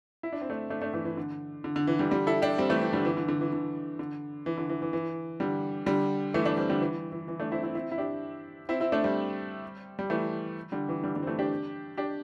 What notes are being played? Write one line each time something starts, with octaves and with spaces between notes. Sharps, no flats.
E4
D4
C4
A3 D4
A3 D4
A3 D4
E3 A3
E3
D3
D3
D3
E3
D3 G3
D3 G3
E4 A4
D4 G4
G3 C4
E3 A3
E3
D3 G3
E3
D3
D3
E3
D3
D3
E3
D3
E3
E3
E3
D3 G3
D3 G3
E3 A3
A3 D4
G3 C4
D3 G3
E3
E3
E3
A3 D4
C4 E4
C4 E4
C4 E4
E4
D4 G4
C4 E4
C4 E4
A3 D4
G3 C4
G3
E3 A3
D3 G3
E3
D3 G3
D3 G3
C4
E3 A3
D4 G4
D4 G4